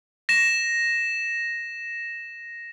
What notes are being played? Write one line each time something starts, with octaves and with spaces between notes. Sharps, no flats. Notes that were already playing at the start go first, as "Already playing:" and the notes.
A#6 E7